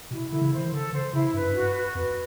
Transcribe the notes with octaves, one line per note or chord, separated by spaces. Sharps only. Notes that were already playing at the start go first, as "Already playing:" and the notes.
B2 E4
D3 E4
C#3
D#3 C5
D3 A4
D3 C5
C#3 E4
G2 B4
F#2
G2
F#4
F#4
F2 B4